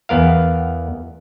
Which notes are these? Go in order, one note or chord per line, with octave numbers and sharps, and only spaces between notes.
E2 B3 A#4 F5